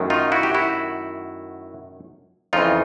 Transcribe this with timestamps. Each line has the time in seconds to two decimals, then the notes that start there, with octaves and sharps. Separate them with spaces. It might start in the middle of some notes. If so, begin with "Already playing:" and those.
Already playing: F#2 D#3 F#3 A3
0.10 D#4 F4
0.32 E4 F#4
0.43 G4
0.54 E4 F#4
2.53 F2 C#3 E3 D#4 F4